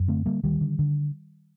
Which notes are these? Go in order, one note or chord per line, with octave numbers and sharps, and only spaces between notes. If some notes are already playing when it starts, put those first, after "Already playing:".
Already playing: F#2
D3 A3 C4
D3 G3 A#3
D2 D#3 G3
D3
D3